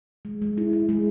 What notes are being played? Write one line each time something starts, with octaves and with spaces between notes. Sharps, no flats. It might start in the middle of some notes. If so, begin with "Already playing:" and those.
G#3
G#3
E4
E4
G#3